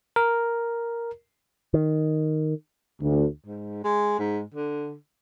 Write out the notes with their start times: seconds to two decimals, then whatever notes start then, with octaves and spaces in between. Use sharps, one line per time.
0.16 A#4
1.74 D#3
3.01 D2
3.45 G#2
3.84 G#3
4.19 G#2
4.54 D3